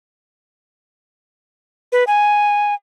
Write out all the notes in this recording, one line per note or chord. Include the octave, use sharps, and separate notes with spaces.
B4
G#5